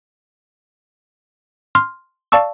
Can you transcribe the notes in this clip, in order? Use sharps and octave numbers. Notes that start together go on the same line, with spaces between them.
C6 F6
D5 F5 A5 C#6 E6